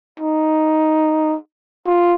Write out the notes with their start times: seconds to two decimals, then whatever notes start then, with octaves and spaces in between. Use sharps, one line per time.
0.20 D#4
1.86 F4